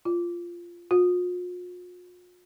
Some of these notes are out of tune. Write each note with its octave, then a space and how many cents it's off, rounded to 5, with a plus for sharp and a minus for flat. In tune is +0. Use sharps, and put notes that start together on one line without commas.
F4 -10
F4 +45